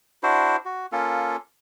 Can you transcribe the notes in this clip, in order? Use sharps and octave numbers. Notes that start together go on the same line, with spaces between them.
D4 E4 F#4 C5
F#4
A#3 C#4 F4 A4